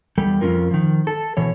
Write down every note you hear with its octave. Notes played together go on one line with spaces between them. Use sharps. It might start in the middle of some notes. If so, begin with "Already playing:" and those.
E2 G3 A4
F2 C#3 C#4 F4 A#4
D#3 F3
A4
B2 E3 C#5